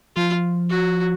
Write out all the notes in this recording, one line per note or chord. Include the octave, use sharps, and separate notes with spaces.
F3 F4
F#4